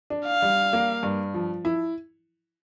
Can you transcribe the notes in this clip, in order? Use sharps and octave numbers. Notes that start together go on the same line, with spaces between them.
D4
F5
G3
A#3
G2
F3
E4